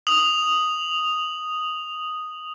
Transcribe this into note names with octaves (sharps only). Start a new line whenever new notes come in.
D#6 F7 F#7